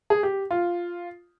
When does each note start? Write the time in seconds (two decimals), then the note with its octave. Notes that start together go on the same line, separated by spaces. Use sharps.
0.10 G#4
0.23 G4
0.51 F4